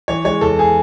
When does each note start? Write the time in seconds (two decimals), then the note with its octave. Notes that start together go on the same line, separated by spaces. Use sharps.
0.08 E3 C#5
0.25 G#3 C#5
0.41 E2 A4
0.59 G#4